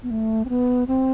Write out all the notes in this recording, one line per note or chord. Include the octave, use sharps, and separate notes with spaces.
B3
A3
C4
B3
C4